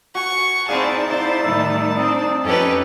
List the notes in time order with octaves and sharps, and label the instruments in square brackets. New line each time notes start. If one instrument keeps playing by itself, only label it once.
[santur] F#4 G#5 [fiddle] C#6
[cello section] C4 E4 G#4 [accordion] D#4 D5 [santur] B4 F5 [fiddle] A5
[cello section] E4 C5
[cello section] A2 D#3 G3 [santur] E5 B5
[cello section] C4 D4 [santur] D#6
[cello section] F2 C#4 D#4 [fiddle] G4 B4 [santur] A4 [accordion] G#5